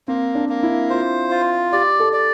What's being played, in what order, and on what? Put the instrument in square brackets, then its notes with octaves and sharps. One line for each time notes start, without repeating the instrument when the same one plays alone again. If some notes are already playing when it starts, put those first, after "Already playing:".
[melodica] A#3 [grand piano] C4
[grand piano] D4
[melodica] A#3
[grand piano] E4
[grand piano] F4 [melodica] C5
[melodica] F4
[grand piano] G4 [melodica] D5
[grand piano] A4
[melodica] D5